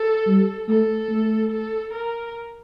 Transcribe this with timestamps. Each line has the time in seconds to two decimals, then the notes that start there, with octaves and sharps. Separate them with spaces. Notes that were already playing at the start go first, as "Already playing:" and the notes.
Already playing: A4
0.27 G3
0.69 A3 A4
1.10 A3
1.52 A4
1.94 A#4